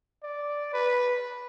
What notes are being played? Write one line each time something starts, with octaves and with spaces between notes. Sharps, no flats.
D5
B4